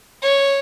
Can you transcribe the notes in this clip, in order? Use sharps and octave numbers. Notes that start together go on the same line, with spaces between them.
C#5